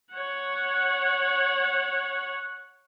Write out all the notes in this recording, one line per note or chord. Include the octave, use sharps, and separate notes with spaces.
C#5 F#5